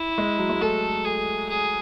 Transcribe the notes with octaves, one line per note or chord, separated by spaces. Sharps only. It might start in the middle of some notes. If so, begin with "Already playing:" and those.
Already playing: E4
G#3
F#3
G#3
A3 A4
G#4
G#4